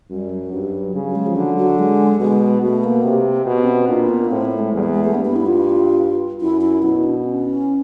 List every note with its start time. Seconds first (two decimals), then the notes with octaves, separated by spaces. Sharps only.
0.10 F#2 G3
0.31 F#3
0.53 G2
0.94 C#3 G3
1.05 F#3
1.15 G#3
1.26 F3
1.36 D3 F#3
1.57 F#3
1.79 G#3
2.20 B2 G#3
2.62 B2 A3
2.84 A#3
3.04 C3
3.46 B2 B3
3.63 C#4
3.67 C4
3.88 A#2 D4
4.09 B3
4.25 B3
4.31 A2 C4
4.45 A3
4.59 G#3
4.72 E2 G3
4.83 G#3
4.93 G#3
5.04 A3
5.14 G2 B3
5.25 B3
5.36 E4
5.46 F4
6.41 F#2 E4
6.61 E4
6.83 B2 E4
7.05 D4
7.25 C#4